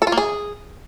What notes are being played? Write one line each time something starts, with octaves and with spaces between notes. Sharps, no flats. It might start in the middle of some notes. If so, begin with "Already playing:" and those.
A4
F4
A#3
G#4